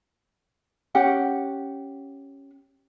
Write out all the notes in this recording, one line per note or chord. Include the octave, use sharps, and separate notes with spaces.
C#4 G4 F#5